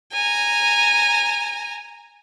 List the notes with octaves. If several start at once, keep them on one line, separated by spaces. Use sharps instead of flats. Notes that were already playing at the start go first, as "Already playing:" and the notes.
G#5 A#5